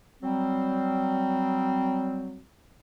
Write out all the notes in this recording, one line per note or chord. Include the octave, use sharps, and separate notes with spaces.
F#3 G3 C4